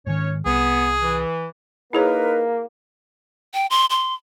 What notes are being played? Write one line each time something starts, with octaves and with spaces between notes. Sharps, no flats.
G#2 D#3 C#4 C#5
C2 B3 G#4
E3
A#3 D#4 E4 G#4 A#4 B4 C#5
G5
C6
C6